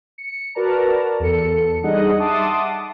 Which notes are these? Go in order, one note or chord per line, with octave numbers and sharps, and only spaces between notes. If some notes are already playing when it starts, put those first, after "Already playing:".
C#7
F#4 A#4 B4 D5 A5 A#5
E2 A4 C#7
G3 D4 D#4 G#4 D#5 F#5
E5 F#5 A5 C6 D6 D#6